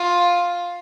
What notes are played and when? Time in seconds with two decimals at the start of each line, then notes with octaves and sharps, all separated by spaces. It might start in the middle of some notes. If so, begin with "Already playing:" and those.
Already playing: F4